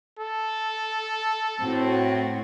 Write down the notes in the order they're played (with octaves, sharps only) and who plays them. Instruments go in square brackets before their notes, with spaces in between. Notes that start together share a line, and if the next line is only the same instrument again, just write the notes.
[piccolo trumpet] A4
[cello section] A2 C4 F#4